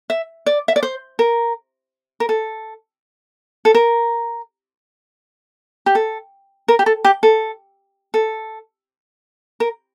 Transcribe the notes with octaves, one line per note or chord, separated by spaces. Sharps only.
E5
D5
E5
D5
C5
A#4
A#4
A4
A4
A#4
G4
A4
A#4
G4
A4
G4
A4
A4
A#4